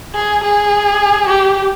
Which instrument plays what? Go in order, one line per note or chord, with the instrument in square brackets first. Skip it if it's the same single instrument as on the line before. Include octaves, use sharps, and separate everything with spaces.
[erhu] G#4
G#4
G4